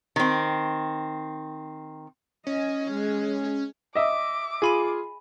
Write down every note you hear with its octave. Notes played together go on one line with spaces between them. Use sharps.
D#3 C4
C#4 D#5
G#3
D#5 E5 D6
F4 G#4 G#5 B5 D#7